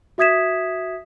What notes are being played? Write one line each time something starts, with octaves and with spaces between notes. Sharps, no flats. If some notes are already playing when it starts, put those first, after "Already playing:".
F#4 E5 D#6 G#6 B6 E7